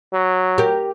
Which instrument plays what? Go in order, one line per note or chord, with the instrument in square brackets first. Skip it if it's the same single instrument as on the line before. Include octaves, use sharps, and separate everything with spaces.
[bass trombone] F#3
[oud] G4 A#4